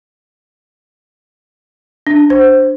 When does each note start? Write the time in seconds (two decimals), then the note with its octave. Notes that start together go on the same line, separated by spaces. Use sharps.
2.07 D4
2.30 C5